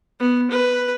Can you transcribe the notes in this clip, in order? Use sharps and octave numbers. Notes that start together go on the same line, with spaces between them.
B3
B4